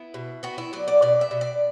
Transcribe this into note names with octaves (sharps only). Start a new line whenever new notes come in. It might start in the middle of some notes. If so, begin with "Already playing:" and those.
Already playing: B3 E4
B2
B3 F#4
E4
F#3 D5
D5
B2 D5
E5
B2
D5